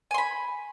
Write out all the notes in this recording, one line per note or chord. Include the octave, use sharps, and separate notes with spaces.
G#5 B5 C6